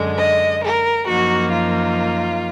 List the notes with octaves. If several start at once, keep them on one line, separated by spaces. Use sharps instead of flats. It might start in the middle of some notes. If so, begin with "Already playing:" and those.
Already playing: F#2 D3 G#3
D#5
A#4
F#2 F3 A#3 D#4 F#4
F4